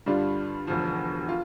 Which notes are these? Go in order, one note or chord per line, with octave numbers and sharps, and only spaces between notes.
G2 D3 G3 D4 F4
E1 D2 D3 F3
F4